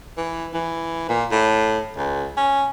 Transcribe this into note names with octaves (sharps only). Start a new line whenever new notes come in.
E3
E3
A#2
A2
C#2
C#4